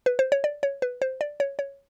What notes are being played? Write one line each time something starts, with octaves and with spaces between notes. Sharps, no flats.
B4
C5
C#5
D5
C#5
B4
C5
D5
C#5
C#5